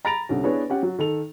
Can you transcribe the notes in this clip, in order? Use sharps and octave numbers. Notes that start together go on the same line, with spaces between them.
A#5 B5 A6 A#6 D7 F7
C2 D3 C#4
B3 D4 E4 G#4 B4 C#5
C#4 G4 F#5
F#3
D#3 A4 F7